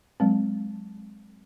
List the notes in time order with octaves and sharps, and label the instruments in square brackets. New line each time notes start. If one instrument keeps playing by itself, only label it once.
[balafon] F#3 G#3 C4